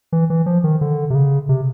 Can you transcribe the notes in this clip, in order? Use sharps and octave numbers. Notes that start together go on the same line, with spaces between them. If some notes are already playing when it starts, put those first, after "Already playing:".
E3
E3
F3
D#3
D3
C3
C#3
C3